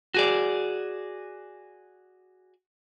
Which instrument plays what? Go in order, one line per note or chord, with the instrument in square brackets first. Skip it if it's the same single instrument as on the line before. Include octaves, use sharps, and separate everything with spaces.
[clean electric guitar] F#4 G#4 D5